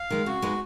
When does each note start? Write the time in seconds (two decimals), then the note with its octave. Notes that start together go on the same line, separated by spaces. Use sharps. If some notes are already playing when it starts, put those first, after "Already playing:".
Already playing: F5
0.10 D#3 G#3
0.26 C#3 F#4
0.42 G#3 B3 D#4